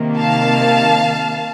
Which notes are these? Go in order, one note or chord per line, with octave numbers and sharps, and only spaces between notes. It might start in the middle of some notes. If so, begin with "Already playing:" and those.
Already playing: C3 D#3 A#3
F5 A5